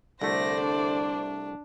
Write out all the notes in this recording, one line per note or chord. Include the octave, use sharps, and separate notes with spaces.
C2 D3 A3 C5 D5 A#6
D4